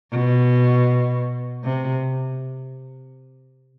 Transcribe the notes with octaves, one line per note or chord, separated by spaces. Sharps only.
B2
C3